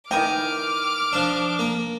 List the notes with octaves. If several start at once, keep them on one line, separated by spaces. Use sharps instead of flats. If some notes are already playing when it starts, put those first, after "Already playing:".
D#3 E3 G5 G#5 A#5 D6 F6
F3 D4
A#3